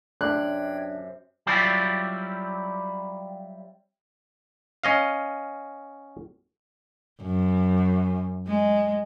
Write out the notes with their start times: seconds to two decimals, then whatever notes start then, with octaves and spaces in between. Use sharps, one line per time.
0.21 F#2 C3 D4 G5 F#6 G#6
1.47 F#3 G3 C4 E4 F4 G4
4.84 C#4 D#5 F5
7.22 F#2
8.47 G#3